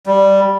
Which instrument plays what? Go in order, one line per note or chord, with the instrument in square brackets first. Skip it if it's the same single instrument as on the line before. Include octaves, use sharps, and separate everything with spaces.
[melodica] G3